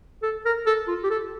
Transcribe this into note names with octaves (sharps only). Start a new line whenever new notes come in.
A4
A#4
A4
F4
G4
A4